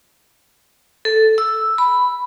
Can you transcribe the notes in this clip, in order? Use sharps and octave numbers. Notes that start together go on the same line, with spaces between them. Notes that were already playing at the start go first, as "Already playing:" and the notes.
A4
E6
B5